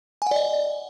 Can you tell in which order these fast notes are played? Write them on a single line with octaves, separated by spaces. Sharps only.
G#5 F#5 D5 D#5